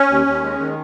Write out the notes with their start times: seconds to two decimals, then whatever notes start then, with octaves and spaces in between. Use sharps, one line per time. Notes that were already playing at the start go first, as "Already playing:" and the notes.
Already playing: C#4
0.09 D#2
0.26 D#2
0.43 G#3
0.59 D#3